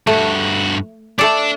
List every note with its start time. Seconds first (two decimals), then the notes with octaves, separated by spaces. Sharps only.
0.07 G2 A3 F#4
1.19 A3 D4 A4 D5